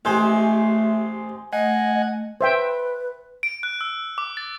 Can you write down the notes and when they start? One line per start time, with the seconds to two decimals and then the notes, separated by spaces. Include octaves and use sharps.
0.05 A1 G#3 A3 G4 C5 G#5
1.53 A3 D#5 F#5 G#5
2.41 B4 C5 E5 G5
3.43 D7
3.63 F#6
3.81 E6
4.18 D6
4.37 A6